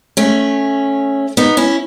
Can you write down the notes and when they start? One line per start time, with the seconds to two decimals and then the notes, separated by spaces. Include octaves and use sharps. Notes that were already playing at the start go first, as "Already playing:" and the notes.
0.17 A3 C#4
1.37 B3 D#4
1.57 C#4 E4